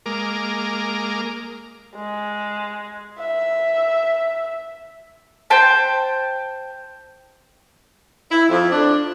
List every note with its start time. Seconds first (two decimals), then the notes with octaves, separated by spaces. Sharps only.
0.06 G#3 A#3 A#4 D6
1.96 G#3
3.19 E5
5.50 C5 G5 A5
8.30 E4
8.48 F2
8.71 D4